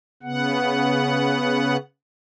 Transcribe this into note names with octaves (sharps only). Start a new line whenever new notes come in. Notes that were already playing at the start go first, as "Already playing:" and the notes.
C#3 B3 F#5